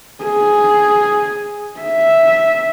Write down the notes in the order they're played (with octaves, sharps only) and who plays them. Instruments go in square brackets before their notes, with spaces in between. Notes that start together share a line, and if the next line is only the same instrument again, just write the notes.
[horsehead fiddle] G#4
E5